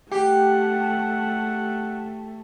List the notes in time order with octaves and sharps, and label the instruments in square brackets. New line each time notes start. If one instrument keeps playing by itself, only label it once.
[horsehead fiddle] A3 [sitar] G4 [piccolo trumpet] F#5 [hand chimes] G5